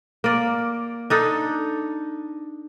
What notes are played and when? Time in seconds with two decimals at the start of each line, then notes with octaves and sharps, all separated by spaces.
0.24 A#3 D5
1.10 D4 D#4 A4